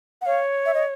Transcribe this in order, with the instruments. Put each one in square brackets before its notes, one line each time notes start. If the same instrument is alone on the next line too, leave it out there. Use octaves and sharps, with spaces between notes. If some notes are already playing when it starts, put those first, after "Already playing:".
[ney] F#5
[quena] C#5 [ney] F5
[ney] E5
D#5